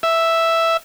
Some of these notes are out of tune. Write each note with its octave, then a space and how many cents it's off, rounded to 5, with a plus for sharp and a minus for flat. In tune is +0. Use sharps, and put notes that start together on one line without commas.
E5 +0